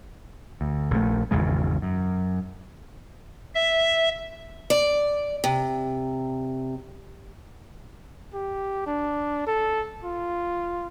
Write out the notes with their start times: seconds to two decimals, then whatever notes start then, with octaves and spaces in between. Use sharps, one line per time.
0.61 D2
0.91 A#1 D#3 A3
1.31 G#1 E2 C#3 G#3
1.82 F#2
3.55 E5
4.70 D5
5.44 C3
8.34 G4
8.86 D4
9.47 A4
10.04 F4